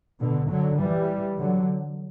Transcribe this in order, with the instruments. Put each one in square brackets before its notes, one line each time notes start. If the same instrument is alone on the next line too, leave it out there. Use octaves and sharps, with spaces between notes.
[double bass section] B2 D3
D3 F#3
E3 G3
D3 F#3